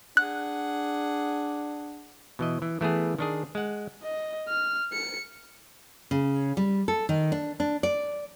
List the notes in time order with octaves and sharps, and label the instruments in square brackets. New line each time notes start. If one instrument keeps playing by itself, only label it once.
[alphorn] D4 [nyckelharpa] G#4 F#5 [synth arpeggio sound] F#6
[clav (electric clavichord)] B2 E3 D#5
E3
E3 A3 B3 G#4
D#3 D4 G#4
G#3 F#5
[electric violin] D#5
F6
C#7
[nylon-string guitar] C#3
G3
A4
D#3
D4
D4
D5